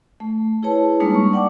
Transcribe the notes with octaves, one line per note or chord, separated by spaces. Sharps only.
A3
E4 G#4 B4 C#5 A5
G3 G#3 A#3 D4 D#4
C#6
D5 F#5 G5 A5 D6